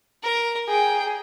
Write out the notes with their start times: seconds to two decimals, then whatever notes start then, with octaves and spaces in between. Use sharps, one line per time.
0.23 A#4
0.69 G#4 G5